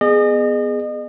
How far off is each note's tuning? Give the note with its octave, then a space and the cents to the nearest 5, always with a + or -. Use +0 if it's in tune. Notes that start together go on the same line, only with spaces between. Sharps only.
B3 +5 G#4 +0 D#5 -35